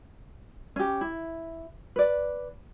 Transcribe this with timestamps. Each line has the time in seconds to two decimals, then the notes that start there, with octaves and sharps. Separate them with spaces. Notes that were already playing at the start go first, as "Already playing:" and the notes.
0.76 C#4 G4
1.01 E4
1.96 B4 D5